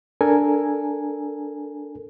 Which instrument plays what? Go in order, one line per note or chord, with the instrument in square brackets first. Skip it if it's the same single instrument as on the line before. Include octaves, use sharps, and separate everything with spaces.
[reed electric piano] D4 A4 A#4 G#5